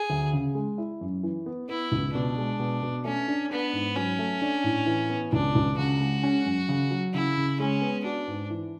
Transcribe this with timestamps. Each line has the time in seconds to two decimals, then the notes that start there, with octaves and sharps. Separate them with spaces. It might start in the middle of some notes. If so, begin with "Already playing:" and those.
Already playing: G#4
0.10 D2
0.33 C#3
0.55 G#3
0.78 E4
1.01 F#2
1.23 E3
1.46 B3
1.69 B3 E4
1.92 C#2
2.14 B2 D4
2.38 G#3
2.59 B2
2.83 B2
3.05 A3 C#4
3.28 D4
3.51 B3 D4
3.73 G#2
3.95 F#3 C#4
4.19 A3
4.41 D4
4.64 A2
4.86 E3
5.10 B3
5.32 C#2 D4
5.55 C#2
5.78 C#3 F#4
6.00 G#3
6.23 C#4
6.46 F#2
6.69 C#3
6.91 F#3
7.14 C#3 E4
7.37 C#3
7.60 G#3 C#4
7.82 B3
8.05 D4 F#4
8.27 G#2
8.50 E3